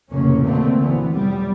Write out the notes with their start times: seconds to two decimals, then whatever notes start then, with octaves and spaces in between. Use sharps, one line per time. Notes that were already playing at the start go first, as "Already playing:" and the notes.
0.11 F1 A2 C#3 A#3 C#4
0.41 B2 D3 A3 A#3 C4
0.76 D2 E3 B3
1.12 F1 G3